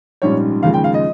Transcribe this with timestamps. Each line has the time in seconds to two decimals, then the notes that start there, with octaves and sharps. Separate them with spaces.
0.22 A#1 G#2 G3 C#4 C#5
0.63 D#2 C#3 F3 G#3 F5
0.74 G5
0.84 F5
0.94 D#5